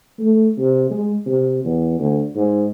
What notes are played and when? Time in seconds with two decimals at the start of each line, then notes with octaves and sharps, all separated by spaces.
0.19 A3
0.59 C3
0.91 G#3
1.26 C3
1.64 E2
1.99 D2
2.35 G#2